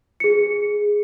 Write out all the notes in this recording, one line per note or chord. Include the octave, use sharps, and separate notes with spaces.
G#4 C#7